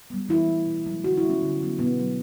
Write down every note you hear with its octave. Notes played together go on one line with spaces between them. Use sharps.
G3 B3
E3 E4
A3
B2
F#3 A3
D3 F#4
E4
G3 B3
C#4
D3
F#3 B3
B2 B3
F#3 A3